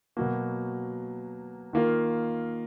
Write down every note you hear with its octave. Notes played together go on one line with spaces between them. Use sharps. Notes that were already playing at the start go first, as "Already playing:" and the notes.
B2 F#3 A#3
D#3 A#3 F4 A#4